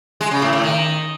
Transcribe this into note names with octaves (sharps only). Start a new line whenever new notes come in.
G#3
C#3
A2
A2
D#3